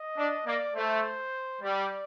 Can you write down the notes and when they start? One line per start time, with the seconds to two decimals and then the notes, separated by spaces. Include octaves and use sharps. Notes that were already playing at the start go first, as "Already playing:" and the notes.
Already playing: D#5
0.18 D4
0.46 A#3 D5
0.75 A3 C5
1.62 G3 D5